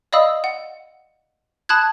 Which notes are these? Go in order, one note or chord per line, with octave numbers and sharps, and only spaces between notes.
D5 D#5 F5 B5 D#6 E6
F#5
A5 B5 D#6 F#6 G#6